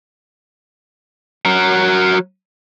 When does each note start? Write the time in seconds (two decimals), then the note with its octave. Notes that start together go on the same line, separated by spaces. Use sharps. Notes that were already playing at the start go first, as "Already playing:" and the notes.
1.45 F#3 A#4